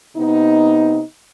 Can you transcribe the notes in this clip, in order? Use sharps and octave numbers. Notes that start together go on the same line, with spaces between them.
C3 B3 D#4